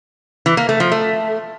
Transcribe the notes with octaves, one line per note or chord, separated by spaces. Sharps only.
E3
A#3
A3
F3
A3